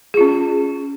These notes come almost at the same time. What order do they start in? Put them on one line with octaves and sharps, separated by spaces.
G#4 F4 C#4